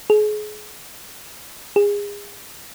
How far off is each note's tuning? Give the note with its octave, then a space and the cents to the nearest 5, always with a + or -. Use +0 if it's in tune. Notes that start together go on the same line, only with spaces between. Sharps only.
G#4 +30
G#4 -30